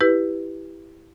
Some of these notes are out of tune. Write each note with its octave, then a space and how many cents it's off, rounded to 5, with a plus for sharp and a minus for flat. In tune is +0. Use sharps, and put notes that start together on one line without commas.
E4 +0 G4 +0 B4 +0